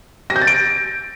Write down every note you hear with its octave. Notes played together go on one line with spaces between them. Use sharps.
A#6
G6
A6
D7